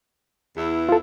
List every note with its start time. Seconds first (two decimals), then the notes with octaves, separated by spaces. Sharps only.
0.57 E2 E4
0.89 F4 A4